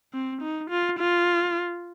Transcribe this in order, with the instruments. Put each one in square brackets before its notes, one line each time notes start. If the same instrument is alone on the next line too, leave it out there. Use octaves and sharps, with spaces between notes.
[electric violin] C4
D#4
F4
F4